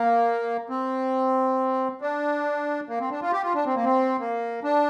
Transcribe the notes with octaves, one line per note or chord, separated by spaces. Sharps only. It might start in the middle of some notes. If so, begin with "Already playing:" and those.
Already playing: A#3
C4
D4
A#3
C4
D4
F4
G4
F4
D4
C4
A#3
C4
A#3
D4